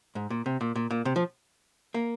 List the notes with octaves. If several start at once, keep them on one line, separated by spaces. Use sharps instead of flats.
G#2
A#2
C3
A#2
A#2
A#2
C3
F3
A#3